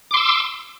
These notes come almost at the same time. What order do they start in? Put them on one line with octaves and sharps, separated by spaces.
D6 C6 E6